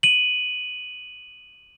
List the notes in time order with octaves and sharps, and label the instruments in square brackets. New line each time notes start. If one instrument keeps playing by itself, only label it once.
[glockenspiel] D#7 F#7